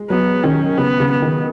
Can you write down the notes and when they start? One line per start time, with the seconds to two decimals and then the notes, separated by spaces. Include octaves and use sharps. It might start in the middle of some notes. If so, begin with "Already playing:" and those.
Already playing: G#3
0.10 F#3 B3
0.44 D#3 C#4
0.78 C#3 B3
1.00 C#3
1.11 B3
1.22 D#3